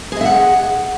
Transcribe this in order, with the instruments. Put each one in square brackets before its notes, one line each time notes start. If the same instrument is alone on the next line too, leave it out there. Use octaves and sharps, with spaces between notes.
[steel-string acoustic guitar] G#4
D#5
E5
F#5